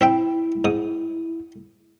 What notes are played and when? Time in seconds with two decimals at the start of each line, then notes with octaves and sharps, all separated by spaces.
0.01 C4 E4 E5 G5
0.65 G#2 D#6